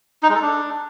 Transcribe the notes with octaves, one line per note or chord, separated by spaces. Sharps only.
D#4
G#3
A4
D4